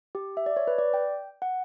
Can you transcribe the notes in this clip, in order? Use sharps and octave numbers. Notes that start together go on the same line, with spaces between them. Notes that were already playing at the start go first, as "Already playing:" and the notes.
G4
E5
D5
C#5
B4
D5
G5
F#5